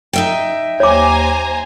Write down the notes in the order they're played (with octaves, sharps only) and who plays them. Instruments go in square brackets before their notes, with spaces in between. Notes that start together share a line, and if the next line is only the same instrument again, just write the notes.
[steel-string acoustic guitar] D#4 E5 G5
[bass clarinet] D#2 [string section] C5 G#5 A#5 [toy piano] C#5 D6